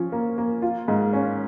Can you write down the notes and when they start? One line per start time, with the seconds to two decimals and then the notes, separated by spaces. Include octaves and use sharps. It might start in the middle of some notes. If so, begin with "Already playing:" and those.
Already playing: F3 C#4
0.12 A#3
0.38 A#3
0.62 F4
0.88 G#2
1.13 C#4